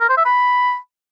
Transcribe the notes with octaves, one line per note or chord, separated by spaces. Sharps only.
A#4
C5
E5
B5